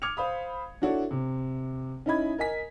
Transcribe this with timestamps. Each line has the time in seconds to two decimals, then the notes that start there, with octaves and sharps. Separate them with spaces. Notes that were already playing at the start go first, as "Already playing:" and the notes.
0.02 D6 F6 G#6 C#7 F7
0.17 C5 F5 B5 D#6
0.82 D4 E4 F#4 A4 C#5 D5
1.11 C3
2.06 C#4 D#4 E4 D#5 B5 G#6
2.38 A#4 D#5 G#5 B6